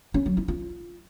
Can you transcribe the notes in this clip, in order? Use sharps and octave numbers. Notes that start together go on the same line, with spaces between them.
C#4
F#3
E4
F4